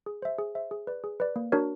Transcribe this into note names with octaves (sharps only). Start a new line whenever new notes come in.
G#4
C5 E5
G#4
C5 E5
G#4
B4 D5
G#4
B4 D5
A#3
D4 F#4 A#4 C#5